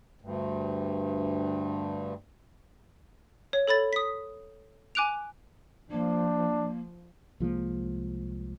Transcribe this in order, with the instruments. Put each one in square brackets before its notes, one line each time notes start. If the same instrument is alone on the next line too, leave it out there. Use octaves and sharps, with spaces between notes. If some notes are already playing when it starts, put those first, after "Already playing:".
[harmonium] D2 G2
[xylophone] C#5
A4 C#5 B5 A6
D#6 B6
G#5 D6 F#6 D7 F7
[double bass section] F3 [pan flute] A#3 [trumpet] D4
[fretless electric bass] C2 F3 G#3 A#3